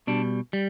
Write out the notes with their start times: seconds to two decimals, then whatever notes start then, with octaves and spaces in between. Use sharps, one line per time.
0.07 B2 G3 D4
0.53 G3